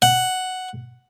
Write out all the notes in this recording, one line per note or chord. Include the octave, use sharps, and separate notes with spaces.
F#5